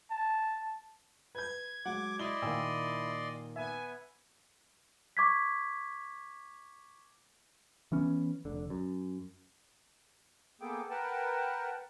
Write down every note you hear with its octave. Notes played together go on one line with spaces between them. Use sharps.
A5
B4 G6 G#6
F#3 G#3 F#5 D6
E4 D5 D#5 C6 G7
A#2 D#3 A#3 G5 G#5 E6
B3 E5 G#5
C#6 D6 G#6 B6
E3 B3 C#4
F1 D3
F#2
A#3 B3 G#4 A4 G5 D6
A#4 B4 F#5 G5 A5